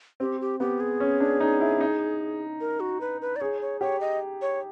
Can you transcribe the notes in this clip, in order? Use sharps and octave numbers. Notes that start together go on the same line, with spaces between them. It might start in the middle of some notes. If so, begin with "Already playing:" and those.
C4 G4
G4
B3 G4
G#4
C#4
D4
D#4
E4
D#4
A#4
F#4
B4
B4
D5
G#4 C#5
C#5
G4 C#5
D#5
C#5